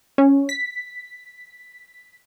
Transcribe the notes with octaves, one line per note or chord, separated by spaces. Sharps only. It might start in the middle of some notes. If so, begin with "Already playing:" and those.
C#4
B6